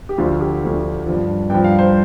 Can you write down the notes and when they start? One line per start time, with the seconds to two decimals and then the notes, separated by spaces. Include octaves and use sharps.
0.09 G4
0.18 D2 D3 F3 F4
0.41 G4
0.62 D2 D3 F3
1.06 G2 F3
1.50 G2 G5
1.54 F3
1.64 F5
1.79 C5